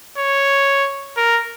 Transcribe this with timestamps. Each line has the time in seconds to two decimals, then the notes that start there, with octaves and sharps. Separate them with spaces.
0.18 C#5
1.17 A#4